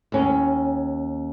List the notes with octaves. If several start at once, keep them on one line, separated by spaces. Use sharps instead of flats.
D#2 C#4